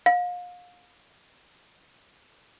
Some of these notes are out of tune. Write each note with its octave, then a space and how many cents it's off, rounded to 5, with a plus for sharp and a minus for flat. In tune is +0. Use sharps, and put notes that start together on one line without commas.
F5 +35